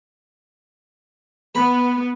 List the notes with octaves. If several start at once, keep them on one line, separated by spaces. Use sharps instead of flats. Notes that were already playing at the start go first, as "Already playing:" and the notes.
B3 B4 B5